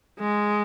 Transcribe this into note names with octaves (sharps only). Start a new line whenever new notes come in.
G#3